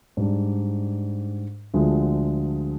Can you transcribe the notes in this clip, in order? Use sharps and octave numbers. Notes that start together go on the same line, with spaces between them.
G#2 G3 D4
D2 D3 F3 G#3